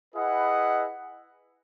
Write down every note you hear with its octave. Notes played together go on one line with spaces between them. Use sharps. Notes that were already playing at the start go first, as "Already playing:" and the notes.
E4 G#4 B4 D#5 F#5